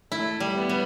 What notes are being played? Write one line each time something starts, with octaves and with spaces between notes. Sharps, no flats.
A3 E4
G3
B3
G3